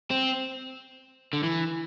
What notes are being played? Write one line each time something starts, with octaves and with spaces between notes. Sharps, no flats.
C4
D3
E3